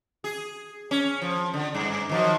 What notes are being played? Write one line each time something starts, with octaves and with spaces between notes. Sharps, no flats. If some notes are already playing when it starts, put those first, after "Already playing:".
G#4
C#4
F3
D3
G2
D#3 F3 F#3